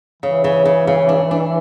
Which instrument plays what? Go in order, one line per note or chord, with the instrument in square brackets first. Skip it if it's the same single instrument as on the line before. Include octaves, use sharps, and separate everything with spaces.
[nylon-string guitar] C#3 [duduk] E3
[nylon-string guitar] C#3
C#3
C#3
D4
D4